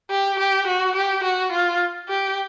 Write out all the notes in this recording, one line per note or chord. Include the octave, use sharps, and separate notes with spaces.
G4
G4
F#4
G4
F#4
F4
G4